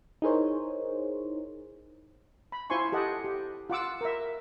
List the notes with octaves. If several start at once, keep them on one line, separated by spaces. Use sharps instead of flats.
D#4 E4 G#4 A#4 C5 C#5
B5
E4 F4 C5 G#5 C6 C#6
G4 A4 D#5 F#5
G4
F4 F#5 D6 E6
A#4 E5